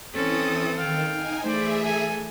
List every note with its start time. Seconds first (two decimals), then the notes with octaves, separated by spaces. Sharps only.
0.14 E3 C4 C#4 A4 D#6
0.77 D#3 F5 G5
1.12 D#4 G#5
1.44 E3 A3 G#4 C5 D5 E5
1.82 A4 G#5